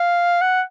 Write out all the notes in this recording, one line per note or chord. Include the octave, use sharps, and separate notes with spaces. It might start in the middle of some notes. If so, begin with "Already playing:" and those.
Already playing: F5
F#5